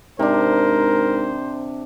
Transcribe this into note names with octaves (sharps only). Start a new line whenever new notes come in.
G#2 C3 D4 A#4 C5